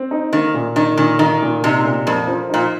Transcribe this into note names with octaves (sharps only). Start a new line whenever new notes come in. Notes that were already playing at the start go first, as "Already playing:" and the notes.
Already playing: C4
D#4
D#3 A#3
A#2
D#3 D#4
A#2 D#3
D#3 A#3
A#2
C3 D#4
A#2
F2 A#3
F3
A#2 D#4